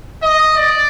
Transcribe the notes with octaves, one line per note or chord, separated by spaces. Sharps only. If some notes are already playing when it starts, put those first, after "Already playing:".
D#5
D5